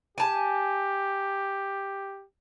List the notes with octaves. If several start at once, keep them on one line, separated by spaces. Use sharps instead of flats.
G4 G#5 A5